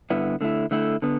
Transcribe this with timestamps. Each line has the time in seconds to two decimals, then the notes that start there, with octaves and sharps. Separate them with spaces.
0.10 G2 D3 B3 E4
0.41 D3 A3 E4
0.71 D3 A3 E4
1.02 D3 B3